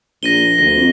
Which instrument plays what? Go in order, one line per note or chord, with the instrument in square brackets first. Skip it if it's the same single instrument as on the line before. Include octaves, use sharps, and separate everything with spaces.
[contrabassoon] A#1 [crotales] A#6 D#7 G7
[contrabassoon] D2 [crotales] A#6
[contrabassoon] F2